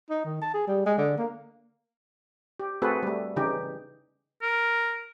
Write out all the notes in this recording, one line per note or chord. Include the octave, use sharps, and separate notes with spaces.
D#4
D#3
A5
G#4
G3
G#3
D3
A#3
G4
A3 C4 F#4 G#4 A4 B4
G3 A3
C#3 E3 D#4 G4
A#4